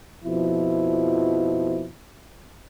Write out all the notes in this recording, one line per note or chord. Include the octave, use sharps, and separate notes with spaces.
F2 B2 F3 E4